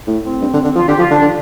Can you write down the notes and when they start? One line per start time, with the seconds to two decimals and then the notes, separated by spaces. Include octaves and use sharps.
0.07 A2
0.24 C4
0.42 G2
0.53 D3
0.64 D3
0.75 F3 F4
0.87 D3 G4
0.99 F3 F4
1.11 D3 D4
1.22 D3